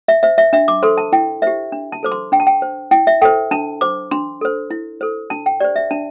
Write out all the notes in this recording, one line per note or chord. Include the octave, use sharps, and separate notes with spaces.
E5
C5 E5
E5
D4 E5
D6
A4 C5 C6
A5
E4 G5
G4 C5 E5
D4
A5
A4 C5 D6
C6
D4 G5
A5
G5
C5
E4 G5
E5
A4 C5 G5
D4 A5
C5 D6
D4 C6
A4 C5
E4
A4 C5
D4 A5
G5
G4 C5 D5
E5
D4 A5